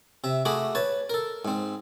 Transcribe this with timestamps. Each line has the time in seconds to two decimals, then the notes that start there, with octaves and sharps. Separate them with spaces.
0.24 C3 E5
0.45 A3 F#4 G#4 B5 D6
0.75 B4 C#5 A5
1.10 A4 A#4
1.45 G#2 C4